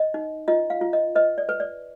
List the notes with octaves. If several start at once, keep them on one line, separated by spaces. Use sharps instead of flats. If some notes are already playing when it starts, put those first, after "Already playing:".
Already playing: D#5
D#4
F4 D#5
F5
F4
D#5
B4 D#5
D5
B4
D5